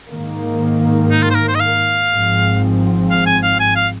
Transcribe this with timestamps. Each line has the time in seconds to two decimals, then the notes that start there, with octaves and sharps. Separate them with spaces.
0.10 G#2 D#3 A#3
1.11 D#4
1.23 F4
1.31 C5
1.35 A#4
1.48 C5
1.55 D#5
1.60 F5
2.10 G#1 G#2 F3 C4
3.10 F5
3.26 G#5
3.43 F5
3.60 G#5
3.76 F5